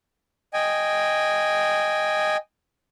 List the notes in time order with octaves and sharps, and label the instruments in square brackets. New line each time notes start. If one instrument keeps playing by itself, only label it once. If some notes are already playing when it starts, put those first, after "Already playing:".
[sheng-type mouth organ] D#5 G5 G#5